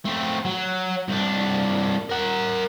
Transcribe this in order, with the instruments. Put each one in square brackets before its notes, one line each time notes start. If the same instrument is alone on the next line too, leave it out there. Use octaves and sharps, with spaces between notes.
[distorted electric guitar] A3 C4
F#3
C2 D4
A#4 F#5